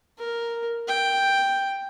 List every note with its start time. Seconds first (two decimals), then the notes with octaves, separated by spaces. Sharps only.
0.18 A#4
0.88 G5